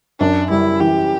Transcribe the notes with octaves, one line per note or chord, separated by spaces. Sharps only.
F#2 D4
G3 E4
E3 G4